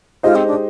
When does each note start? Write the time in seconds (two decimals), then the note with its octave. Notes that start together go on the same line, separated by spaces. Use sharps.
0.23 G#3 D#4 F4 G4 C5 D#5
0.35 C4
0.47 D4